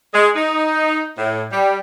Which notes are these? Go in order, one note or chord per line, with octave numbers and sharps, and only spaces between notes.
G#3
D#4
A2
G3